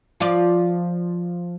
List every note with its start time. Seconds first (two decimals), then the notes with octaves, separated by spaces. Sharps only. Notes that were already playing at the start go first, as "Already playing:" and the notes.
0.20 F3 F4 D5